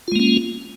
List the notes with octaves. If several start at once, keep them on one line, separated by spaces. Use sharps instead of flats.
G#3 A#3 C#4 F4